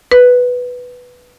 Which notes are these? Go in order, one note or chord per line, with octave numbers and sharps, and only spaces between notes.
B4